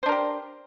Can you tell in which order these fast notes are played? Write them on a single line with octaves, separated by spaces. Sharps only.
C5 D4 A#4 G4